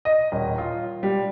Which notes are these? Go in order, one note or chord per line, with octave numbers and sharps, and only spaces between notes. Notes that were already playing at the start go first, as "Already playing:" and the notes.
D#5
D#1
F4
G3